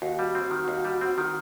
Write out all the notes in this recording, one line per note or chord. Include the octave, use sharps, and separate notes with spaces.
D#2 F#4
G3
C4
D#3
D#2
G3
C4
D#3